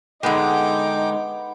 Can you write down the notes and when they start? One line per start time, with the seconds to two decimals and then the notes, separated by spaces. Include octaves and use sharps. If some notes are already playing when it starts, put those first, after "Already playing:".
0.23 D3 G#3 B3 D#4 B4 G5 D6